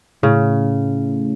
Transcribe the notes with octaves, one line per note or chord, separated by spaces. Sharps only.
A2 C#3